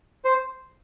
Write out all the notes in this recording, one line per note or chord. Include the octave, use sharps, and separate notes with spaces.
C5